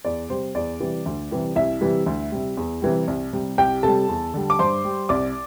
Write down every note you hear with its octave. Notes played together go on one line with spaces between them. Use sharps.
E2 D5
C3 G3 C5
E2 D5
C3 E3 G3
D2
C3 E3 G3
C2 E4 E5
C3 E3 G3
D2
C3 G3
E2
C3 E3 G3
C2
C3 G3
C2 G4 G5
C3 G3 A4 A5
E2
D3 G3
D6
G2 C5 C6
G3
C2 D5 D6